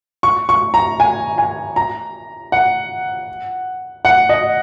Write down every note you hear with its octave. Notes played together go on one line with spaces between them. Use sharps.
C#6
C#6
A#5
G#5
G#5
A#5
F#5
F#5
D#5